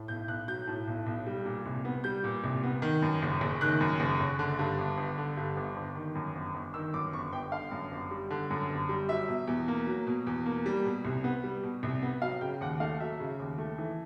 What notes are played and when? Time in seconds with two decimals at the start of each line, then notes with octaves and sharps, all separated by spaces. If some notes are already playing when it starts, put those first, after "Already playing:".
Already playing: A2
0.08 B1 G6
0.28 B1 F#6
0.48 F#3 G6
0.67 A2
0.87 B1
1.06 B1
1.26 G3
1.46 A#2
1.66 C2
1.85 B3
2.04 G3 G6
2.24 A#2
2.44 C2
2.63 B3
2.82 D#3
3.02 F#2
3.22 F#1
3.41 F#1
3.61 D#3 F#6
3.80 F#2
4.00 F#1
4.20 F#1
4.39 D3
4.59 G2
4.78 G1
4.98 G1
5.18 D3
5.37 G2
5.57 G1
5.76 G1
5.95 D#3
6.15 F#2
6.35 G1
6.55 G1
6.74 D#3 E6
6.94 F#2 D6
7.13 G1 C#6
7.33 G1 G5
7.52 D3 F5
7.71 F#2
7.91 G1
8.11 G3
8.30 D3
8.50 F#2
8.69 G1
8.89 G3
9.09 F#3 E5
9.28 B2
9.47 E2
9.68 A#3
9.87 F#3
10.07 B2
10.27 E2
10.46 A#3
10.66 G3
10.85 B2
11.05 C2
11.24 B3
11.44 G3
11.64 B2
11.83 C2
12.02 B3
12.22 F#3 F5
12.41 C#3 G5
12.61 D#2 F#5
12.80 A3 F5
13.00 F#3 E5
13.20 C#3
13.39 D#2
13.58 A3
13.78 E3